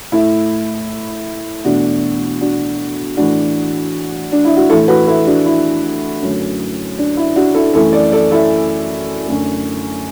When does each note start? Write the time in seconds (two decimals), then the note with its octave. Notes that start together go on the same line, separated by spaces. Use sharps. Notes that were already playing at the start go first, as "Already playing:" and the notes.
0.12 A2 A3 E4
1.64 E2 B2 A3 D4 F#4
2.41 D4 F#4
3.17 A2 E3 A3 D4 F#4
4.32 D4
4.45 E4
4.57 F#4
4.70 A2 E3 A3 E4 A4
4.88 F#4 B4
5.07 E4 A4
5.26 D4 F#4
5.46 E4
6.22 F#2 D3 F#3 A3
6.98 D4
7.17 E4
7.36 D4 F#4
7.55 E4 A4
7.74 F#2 E3 A3 E4 A4
7.93 A4 D5
8.12 A4 D5
8.31 E4 A4
9.27 F#2 D3 A3